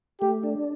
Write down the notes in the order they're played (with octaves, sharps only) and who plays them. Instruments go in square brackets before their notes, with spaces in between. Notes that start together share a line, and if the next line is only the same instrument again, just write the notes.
[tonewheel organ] A3 [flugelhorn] G4
[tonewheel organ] D4